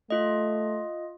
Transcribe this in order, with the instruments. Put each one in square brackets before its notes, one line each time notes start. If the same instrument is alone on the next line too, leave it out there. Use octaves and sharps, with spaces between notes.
[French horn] A3 [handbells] F4 D#5